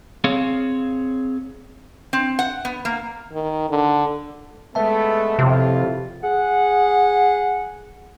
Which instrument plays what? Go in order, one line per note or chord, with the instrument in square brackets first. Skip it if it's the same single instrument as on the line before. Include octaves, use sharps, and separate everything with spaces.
[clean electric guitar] C4 G#4 C#5 F5
[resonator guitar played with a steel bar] C4
F#5
B3
A#3
[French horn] D#3
D3
[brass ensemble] G#3 A3 B3 [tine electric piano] B4 E5 A5
[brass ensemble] F2 A2 F4 [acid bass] C3
[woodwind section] G#4 F#5